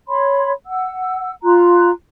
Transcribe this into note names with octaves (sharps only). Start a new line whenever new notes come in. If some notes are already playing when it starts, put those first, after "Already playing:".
C#5 B5 C6
F#5 E6
F4 A#5 C6 F#6